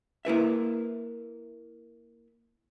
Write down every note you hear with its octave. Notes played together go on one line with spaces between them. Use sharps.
A#3 E4 B4 E5